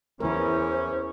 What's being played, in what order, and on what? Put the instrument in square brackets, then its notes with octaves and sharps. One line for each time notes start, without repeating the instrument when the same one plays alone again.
[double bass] E2 [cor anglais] C#4 [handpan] E4 A#4 [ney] C5